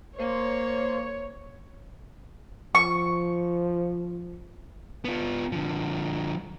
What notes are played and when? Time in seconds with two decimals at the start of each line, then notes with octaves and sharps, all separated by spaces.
0.19 A#3 C5 C#5
2.75 F3 C#6
5.05 B3 F4
5.52 D3 F3